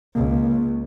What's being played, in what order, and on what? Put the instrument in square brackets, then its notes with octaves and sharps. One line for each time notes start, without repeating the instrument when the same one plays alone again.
[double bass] C#2 [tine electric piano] A#3